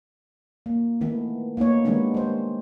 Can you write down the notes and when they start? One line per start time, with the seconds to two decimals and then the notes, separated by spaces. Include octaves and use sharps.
0.66 A#3
1.01 D#3 E3 A3 B3
1.57 A#3 B3 D#4 C#5
1.85 D#3 G3 G#3 B3 D4
2.14 G3 C5